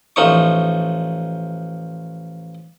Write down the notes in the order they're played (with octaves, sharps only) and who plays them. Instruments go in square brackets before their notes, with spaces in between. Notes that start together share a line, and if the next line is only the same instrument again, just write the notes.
[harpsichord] A1 F3 D#4 C#6